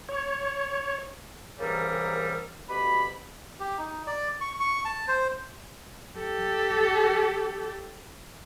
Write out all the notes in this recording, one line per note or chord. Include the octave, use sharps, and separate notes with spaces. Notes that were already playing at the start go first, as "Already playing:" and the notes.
C#5
C2 C#3 E3 G3 A4 A#4
D2 B2 G4 B5
G4
D#4
D5
C#6
C#6
A5
C5
G4 A4